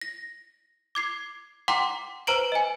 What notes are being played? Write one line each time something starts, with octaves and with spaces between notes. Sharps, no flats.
A#6
D6 G#6 C7
F#5 G5 A#5 C6 D6
B4 C5 A#5 D7 F#7
D#5 G#5